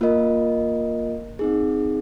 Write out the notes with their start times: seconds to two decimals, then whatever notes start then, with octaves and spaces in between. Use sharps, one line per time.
0.01 A#3 F4 A#4 D#5
1.39 C4 D#4 G#4